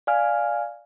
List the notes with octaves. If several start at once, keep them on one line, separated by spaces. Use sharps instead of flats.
D5 F5 G#5 F6